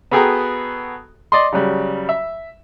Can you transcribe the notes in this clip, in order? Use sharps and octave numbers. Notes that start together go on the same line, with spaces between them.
B3 F#4 G#4 A4 G5 A#5
D5 D#5 C6
C#3 F#3 G3
E5